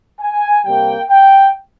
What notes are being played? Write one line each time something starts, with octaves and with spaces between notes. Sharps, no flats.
G#5
C3 G3 A#3 G5
G5